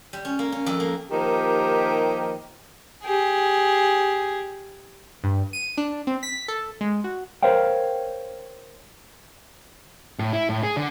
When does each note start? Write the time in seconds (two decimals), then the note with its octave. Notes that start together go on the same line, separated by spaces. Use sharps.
0.13 G3
0.25 C#4
0.39 A#3
0.52 C#4
0.66 F2
0.80 A#3
1.11 D#3 F3 A#3 D#4 G4
3.03 G4 G#4
5.24 G2
5.53 D#7
5.78 D4
6.07 C4
6.23 B6
6.48 A4
6.81 G#3
7.04 F#4
7.43 A#4 C5 C#5 F5 G5
10.19 A2
10.33 E4
10.49 A2
10.63 G#4
10.77 D3